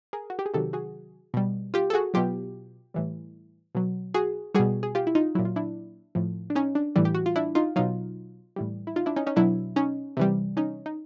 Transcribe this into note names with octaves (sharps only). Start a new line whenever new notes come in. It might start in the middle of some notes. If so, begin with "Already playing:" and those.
G#4 A#4
F#4
G4
G#4
C3 D#3 F#3 G4 A4
F#4 G#4
B2 G3
F4 G4
A4
F#4 G#4
B2 F#3 F4 G4
A2 E3 G3
B2 F#3
F#4 G#4
B2 G3 F#4 G#4
G#4
F4 G4
E4
D#4 F4
A#2 F#3 E4
F4
D4 E4
A2 F3
D4
C#4 D#4
D4
A2 E3 G3
G4
F#4
F4
D4 E4
D#4 F4
B2 F#3 D#4 F4
A2 E3 G3
E4
D#4 F4
D4 E4
C#4 D#4
C#4 D#4
B2 F#3 D4 E4
C#4 D#4
C3 E3 G3
C#4 D#4
D#4